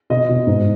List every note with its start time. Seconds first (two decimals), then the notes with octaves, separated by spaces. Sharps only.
0.10 B2 D#5
0.29 B2
0.47 G#2